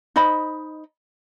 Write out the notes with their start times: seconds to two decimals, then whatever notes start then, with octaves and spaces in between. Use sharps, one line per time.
0.16 D#4 C5 D#5 B5